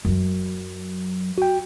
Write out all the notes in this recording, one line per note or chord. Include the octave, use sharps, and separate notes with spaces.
F#2 F#3
F#4 G5